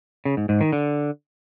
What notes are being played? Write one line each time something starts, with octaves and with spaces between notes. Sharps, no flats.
C#3
G#2
G#2
D#3
D3